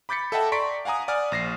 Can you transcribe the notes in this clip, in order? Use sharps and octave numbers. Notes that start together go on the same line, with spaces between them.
B5 D6 G6 A6 B6 C#7
A4 D#5 E5 F#5 G5 A5
D5 A#5 C6 C#6 B6 D7
F5 F#5 G#5 A#5 D#6
D5 F#5 G#5 F6
A#1 A#6 C7